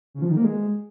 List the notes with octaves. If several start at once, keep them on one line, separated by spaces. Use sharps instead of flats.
C#3
F3
D#3
A#3
G#3